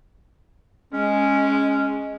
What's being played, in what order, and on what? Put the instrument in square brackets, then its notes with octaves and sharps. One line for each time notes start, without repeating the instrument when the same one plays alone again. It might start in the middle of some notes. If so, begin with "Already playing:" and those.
[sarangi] G#3 [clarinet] C#4